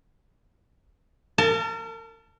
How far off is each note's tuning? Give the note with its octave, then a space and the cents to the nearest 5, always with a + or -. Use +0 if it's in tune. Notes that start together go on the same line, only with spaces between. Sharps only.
A#4 -40 A5 +0